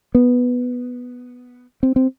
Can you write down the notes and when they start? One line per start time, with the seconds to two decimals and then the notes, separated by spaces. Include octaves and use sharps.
0.15 B3
1.83 C4
1.96 C4